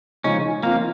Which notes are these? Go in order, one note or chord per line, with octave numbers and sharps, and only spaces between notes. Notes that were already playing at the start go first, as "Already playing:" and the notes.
C#3 F3 G#3 C#4 D#4
F3 A#3 C4 F4 A#4